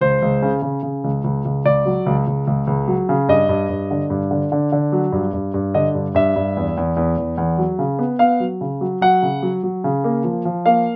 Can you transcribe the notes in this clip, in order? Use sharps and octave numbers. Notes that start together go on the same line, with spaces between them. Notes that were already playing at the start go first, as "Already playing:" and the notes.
C#2 C5
C#2
C#3
C#3
C#3
C#2
C#2
C#2
C#2 D5
F#3
C#2
C#2
C#2
C#2
F#3
C#3
G2 D#5
G2
G2
D3
G2
D3
D3
D3
F#3
G2
G2
G2
D3 D#5
G2
G2 E5
G2
E2
E2
E2
E2
E2
F#3
C#3
B3
B3 F5
F#3
C#3
F#3
F#3 F#5
C#3
F#3
F#3
C#3
A#3
F3
F3
A#3 F5